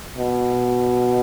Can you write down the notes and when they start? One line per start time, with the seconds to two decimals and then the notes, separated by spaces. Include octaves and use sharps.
0.17 B2